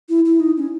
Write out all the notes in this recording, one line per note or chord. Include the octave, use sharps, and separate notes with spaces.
E4
E4
D#4
C#4